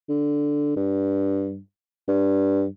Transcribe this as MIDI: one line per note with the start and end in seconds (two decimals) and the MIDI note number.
0.09 0.74 50
0.76 1.59 43
2.08 2.67 43